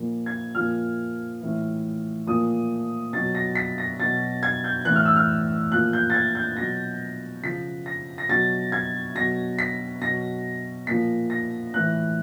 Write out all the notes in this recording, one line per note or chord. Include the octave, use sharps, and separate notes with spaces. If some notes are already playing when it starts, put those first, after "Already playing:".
Already playing: A#2 F3
G#6
A#2 F3 F6
A2 E3
A#2 F3 D#6
B2 F#3 A6
A#6
B6
A#6
B2 F#3 A6
G#6
G6
A2 E3 F#6
F6
E6
F6
A#2 F3 F#6
G6
A6
G#6
G6
B2 F#3 A#6
C#3 F3 B6
A#6
A#6
B2 F#3 A6
G#6
B2 F#3 A#6
B6
B2 F#3 A#6
A#2 F3 B6
A#6
A2 E3 F#6